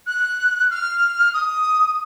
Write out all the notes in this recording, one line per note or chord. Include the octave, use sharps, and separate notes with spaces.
F#6
F6
D#6